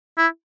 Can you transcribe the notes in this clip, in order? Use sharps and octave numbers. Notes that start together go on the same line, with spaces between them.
E4